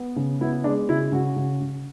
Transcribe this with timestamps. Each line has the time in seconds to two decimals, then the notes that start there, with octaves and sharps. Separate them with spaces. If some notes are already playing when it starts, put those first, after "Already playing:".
Already playing: B3
0.16 C#3
0.41 B3 E4
0.64 G#3 D4
0.89 C#3 E4
1.12 C#3 F#4
1.36 C#3
1.61 C#3